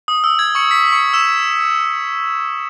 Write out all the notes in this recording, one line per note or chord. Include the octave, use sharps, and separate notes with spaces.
D#6
E6
G#6
C#6 C#7
B6
C#6 C#7
E6 E7